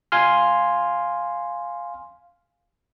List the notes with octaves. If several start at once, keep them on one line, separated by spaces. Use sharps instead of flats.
F5 G#5 C6 F6